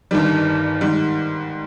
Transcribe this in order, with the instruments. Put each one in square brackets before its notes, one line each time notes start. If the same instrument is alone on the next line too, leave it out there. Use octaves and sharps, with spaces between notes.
[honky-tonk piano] G1 G2 D#3 G3
G#2 D#3 G3